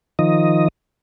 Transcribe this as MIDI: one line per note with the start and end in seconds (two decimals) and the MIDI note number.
0.19 0.68 51
0.19 0.68 53
0.19 0.68 75